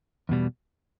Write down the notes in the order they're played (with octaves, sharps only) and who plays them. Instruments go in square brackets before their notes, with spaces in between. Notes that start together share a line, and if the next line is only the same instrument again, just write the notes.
[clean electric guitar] E2 B2 G3